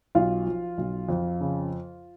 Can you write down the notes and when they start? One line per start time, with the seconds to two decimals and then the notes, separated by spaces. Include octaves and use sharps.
0.15 B1 F4
0.46 F3
0.78 B1
1.09 F2
1.41 C#3